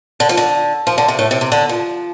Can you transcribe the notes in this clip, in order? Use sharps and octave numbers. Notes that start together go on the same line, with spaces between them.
D3
F3
D3
F3
D3
C3
A2
C3
C3
D3
F3